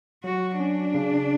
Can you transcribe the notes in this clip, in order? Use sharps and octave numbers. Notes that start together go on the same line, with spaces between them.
F#3 F#4
C#4 D4
C#3